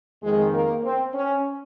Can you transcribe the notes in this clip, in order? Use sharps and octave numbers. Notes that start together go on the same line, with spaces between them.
F2 D#3 G#3
A#3
C4
C#4